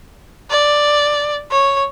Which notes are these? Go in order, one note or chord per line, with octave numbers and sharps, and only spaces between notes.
D5
C#5